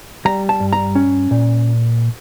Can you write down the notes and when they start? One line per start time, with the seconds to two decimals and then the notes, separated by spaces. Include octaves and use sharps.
0.25 G3 A#5
0.49 A5
0.60 G2
0.73 A#5
0.95 C#4
1.31 A#2